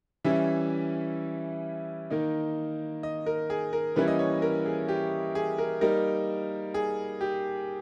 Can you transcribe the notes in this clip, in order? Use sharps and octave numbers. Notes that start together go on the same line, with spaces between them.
E3 G3 C#4 E4 E5
D#3 A#3 D#4
D#5
A#4
G#4
A#4
E3 G3 A#3 C#4 E4 B4
D#5
C#5
A#4
G#4
G4
G#4
A#4
G3 A#3 D#4 A#4
G#4
G4